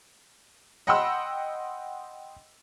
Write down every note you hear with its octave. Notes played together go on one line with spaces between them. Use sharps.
D#5 F#5 G5 B5 C6 E6